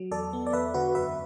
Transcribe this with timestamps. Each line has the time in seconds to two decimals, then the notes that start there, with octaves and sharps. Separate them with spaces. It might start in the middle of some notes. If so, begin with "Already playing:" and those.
Already playing: F#3
0.11 E2 A4 D5
0.33 B3
0.46 D5
0.53 E2 B4 E5
0.74 D3 F#4 B4
0.95 F#2 B4 E5